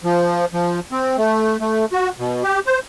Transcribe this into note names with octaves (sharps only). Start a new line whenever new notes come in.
F3
F3
C4
A3
A3
F#4
B2
G4
C5